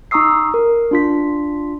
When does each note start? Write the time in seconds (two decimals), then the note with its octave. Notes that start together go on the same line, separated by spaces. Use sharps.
0.11 D#4 A#5 C#6 D#6 E6 C7
0.54 A#4
0.91 D4 F4 B6